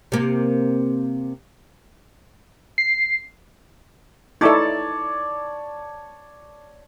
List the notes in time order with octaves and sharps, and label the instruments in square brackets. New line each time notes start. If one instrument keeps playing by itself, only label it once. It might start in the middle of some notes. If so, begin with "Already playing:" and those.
[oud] C3 A#3
[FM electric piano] C7
[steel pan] D#4 E4 A4 [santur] C#5 D5 A5